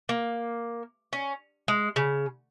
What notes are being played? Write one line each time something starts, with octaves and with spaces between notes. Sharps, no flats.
A#3
C#4
G#3
C#3